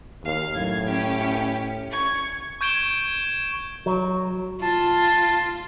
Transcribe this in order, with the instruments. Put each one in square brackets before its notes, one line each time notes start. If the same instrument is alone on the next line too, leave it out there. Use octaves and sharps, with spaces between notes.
[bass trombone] D#2 [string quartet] F5
[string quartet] F#2 G#6 [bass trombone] A2
[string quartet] C#4 G4
C#6 G#6
[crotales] C#6 G6 G#6 D7 E7 G7
[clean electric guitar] F#3
[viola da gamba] F4 [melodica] A5